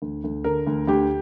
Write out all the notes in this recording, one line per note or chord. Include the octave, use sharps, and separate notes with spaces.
D2
D2
D3 A#4
D2
D2 G4